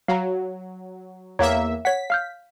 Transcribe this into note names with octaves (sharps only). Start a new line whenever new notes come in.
F#3 F5 A#5
E2 A#3 C#5 E5 A#5
C#5 F#5 B6
F5 F6 G6